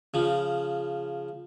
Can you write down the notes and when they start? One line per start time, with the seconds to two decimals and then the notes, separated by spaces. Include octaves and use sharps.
0.14 C#3 F3